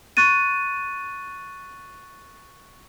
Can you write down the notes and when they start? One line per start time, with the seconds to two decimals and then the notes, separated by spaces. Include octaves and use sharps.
0.17 C#6 F#6 A6 D#7